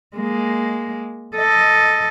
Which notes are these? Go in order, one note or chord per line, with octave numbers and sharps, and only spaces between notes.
G#3 A#3
A4 D#5